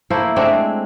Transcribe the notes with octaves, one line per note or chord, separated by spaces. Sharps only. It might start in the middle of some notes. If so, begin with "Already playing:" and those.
A3 A#3 E4 C5
G#3 A3 C4 D4